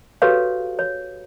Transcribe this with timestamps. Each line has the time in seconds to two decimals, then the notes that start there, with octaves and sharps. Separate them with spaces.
0.22 F#4 G4 A4 B4 C#5 F5
0.79 C#5